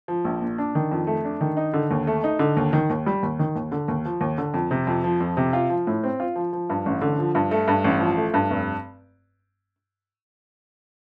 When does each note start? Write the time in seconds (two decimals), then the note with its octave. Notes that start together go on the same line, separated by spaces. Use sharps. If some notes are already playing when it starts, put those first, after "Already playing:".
0.08 F3
0.25 A#1
0.42 A#2
0.58 D4
0.75 D#3
0.91 F2
1.07 A3
1.25 D4
1.41 D#3
1.57 D#4
1.73 D3
1.91 D#2
2.07 A3
2.24 D#4
2.39 D3
2.57 D#2
2.73 D#3
2.90 D#2
3.06 G3
3.23 D#2
3.39 D#3
3.56 D#2
3.72 D3
3.88 D#2
4.05 F3
4.21 D#2
4.38 D3
4.54 F2
4.71 C3
4.87 F2
5.04 F3
5.20 F2
5.37 C3
5.53 F4
5.70 F3
5.87 A2
6.03 C4
6.20 F4
6.36 F3
6.53 F3
6.70 G2
6.86 A1
7.01 D3
7.19 F3
7.35 G2
7.51 A3
7.68 G2
7.85 A1
8.01 F3
8.17 A3
8.34 G2
8.51 F1